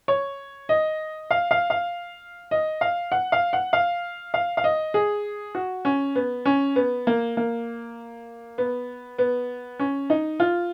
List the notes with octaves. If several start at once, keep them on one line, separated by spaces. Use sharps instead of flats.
C#5
D#5
F5
F5
F5
D#5
F5
F#5
F5
F#5
F5
F5
F5
D#5
G#4
F#4
C#4
B3
C#4
B3
A#3
A#3
B3
B3
C#4
D#4
F4